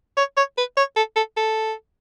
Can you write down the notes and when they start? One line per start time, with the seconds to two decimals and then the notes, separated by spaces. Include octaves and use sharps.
0.17 C#5
0.37 C#5
0.58 B4
0.77 C#5
0.96 A4
1.16 A4
1.37 A4